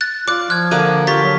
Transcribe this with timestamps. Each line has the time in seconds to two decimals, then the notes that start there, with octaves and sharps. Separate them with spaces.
0.01 F#6 A6
0.28 F4 D5 D6 F#6
0.50 F3 F6 F#6 G#6
0.71 D3 A#3 D5 D#7
1.07 F4 G4 C#6 A6 B6
1.22 F#3